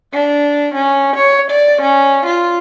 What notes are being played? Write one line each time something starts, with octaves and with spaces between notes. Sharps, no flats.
D4
C#4
C#5
D5
C#4
F4